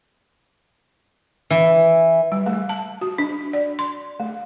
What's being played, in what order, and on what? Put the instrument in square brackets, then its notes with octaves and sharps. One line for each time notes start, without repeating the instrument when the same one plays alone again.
[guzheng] E3
[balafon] G3
A3
A5
F#4
D4
D5
C6
A3